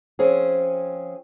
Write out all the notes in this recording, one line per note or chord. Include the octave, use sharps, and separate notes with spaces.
F3 C4 C#4 G#4